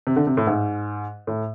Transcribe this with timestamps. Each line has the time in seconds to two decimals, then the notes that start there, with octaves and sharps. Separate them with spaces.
0.07 C3
0.16 D3
0.27 C3
0.37 A2
0.47 G#2
1.27 A2